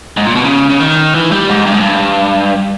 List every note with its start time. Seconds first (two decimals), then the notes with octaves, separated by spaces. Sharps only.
0.17 G#2
0.26 A#2
0.35 B2
0.44 C#3
0.70 C#3
0.80 D#3
1.15 E3
1.32 G3
1.49 G#2
1.66 G2
1.74 G#2
1.80 G2